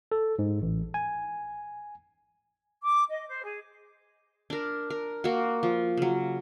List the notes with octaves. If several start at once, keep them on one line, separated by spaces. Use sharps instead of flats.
A4
G#2
A1
G#5
D6
D#5
C5
G#4
D4 A#4
A#4
A#3 F#4
F3
C#3 F#3